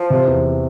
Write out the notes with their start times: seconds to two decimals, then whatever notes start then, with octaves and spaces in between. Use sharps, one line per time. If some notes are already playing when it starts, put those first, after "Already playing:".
Already playing: F3
0.10 C3
0.27 E2